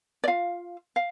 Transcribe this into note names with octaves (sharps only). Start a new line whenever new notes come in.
D5
F4 F5
F5